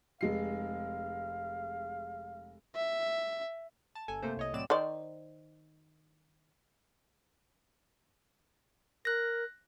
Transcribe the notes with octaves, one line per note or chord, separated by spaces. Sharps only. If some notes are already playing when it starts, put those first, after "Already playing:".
F1 G#3 F5 C7
E5
A5
G1 A4 G#5
C3 A3 A#3 C5
C2 C#5 D#5
A2 F#3 C4 D5 E7
D#3 C5 D5
A#4 F#6 A#6